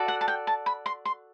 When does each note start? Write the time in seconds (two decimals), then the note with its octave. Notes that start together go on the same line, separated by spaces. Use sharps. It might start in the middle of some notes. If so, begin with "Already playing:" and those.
Already playing: F#4 A4 D5
0.08 F#5
0.21 A5
0.28 G5
0.47 A5
0.66 B5
0.86 C6
1.05 C6